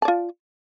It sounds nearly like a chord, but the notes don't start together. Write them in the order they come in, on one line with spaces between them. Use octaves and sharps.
A5 D5 F4